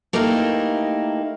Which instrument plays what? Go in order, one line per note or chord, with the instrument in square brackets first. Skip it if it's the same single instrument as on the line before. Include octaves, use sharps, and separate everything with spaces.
[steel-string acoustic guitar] A3 A#3 D#4 E4 G4 A#4